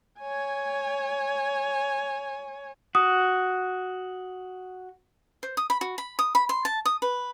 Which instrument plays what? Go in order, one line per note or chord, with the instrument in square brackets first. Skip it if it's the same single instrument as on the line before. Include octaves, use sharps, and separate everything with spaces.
[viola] C#5 G#5
[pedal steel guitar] F#4 [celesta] D#6
[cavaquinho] C5
D#6
B5
F#4
B5
D#6
B5
C6
A5
D#6
B4